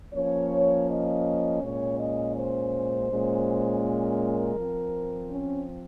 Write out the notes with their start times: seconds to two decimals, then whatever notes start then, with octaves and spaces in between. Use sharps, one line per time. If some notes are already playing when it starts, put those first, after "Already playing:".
0.14 F3 A#3 C#4 C#5
0.88 D#5
1.62 A#2 G#3 C#4 C#5
1.98 D#5
2.36 C5
3.10 A#2 G#3 C#4
3.84 A#4
4.56 F3 C4
5.30 C#4